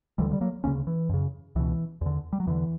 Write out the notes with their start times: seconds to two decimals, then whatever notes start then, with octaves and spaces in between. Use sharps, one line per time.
0.18 D2 D3 E3 G3
0.33 G3
0.41 F#3 A#3
0.64 D2 A#3 C#4
0.67 C#3
0.87 E3
1.09 F#2 C#3
1.56 C#2 B2 E3
2.01 E2 D3
2.33 G3
2.40 F#3
2.47 E2 D3 E3